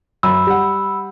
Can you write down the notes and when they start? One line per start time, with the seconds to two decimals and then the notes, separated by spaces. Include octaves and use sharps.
0.23 F#2 B5 E6
0.47 G3 F#5